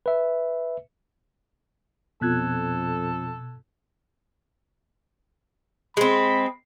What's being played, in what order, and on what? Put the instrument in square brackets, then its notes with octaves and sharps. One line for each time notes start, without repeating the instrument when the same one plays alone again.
[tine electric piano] B4 E5
[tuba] F2 [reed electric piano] B2 F#6 G#6 [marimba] B3 F4 [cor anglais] A4
[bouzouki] G#3 C4 [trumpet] B5